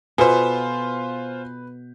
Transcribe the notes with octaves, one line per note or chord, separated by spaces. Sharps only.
B2 F4 A4 B4 C5 G#5